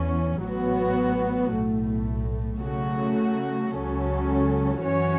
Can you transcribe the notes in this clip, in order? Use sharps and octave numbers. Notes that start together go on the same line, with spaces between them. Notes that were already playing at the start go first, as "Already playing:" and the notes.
Already playing: E2 E3 C#4
A1 A2 F#3 B3 F#4
B1 A2 A3
C#3 F#3 A3 F#4
C#2 C#3 F#3 C#4 A4
F#2 E3 C#4 F#4 C#5